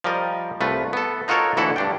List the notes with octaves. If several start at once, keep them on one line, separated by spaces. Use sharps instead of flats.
F3 G3 A#4 D#5
C2 A3 F4 B4
B3 A4
D#4 F4 F#4 A4 A#4 C#5
D2 E3 E4 F#4 A4 F#5
G2 D4 G5